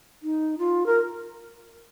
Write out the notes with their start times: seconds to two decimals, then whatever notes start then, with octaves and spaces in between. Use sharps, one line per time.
0.23 D#4
0.58 F4
0.86 A#4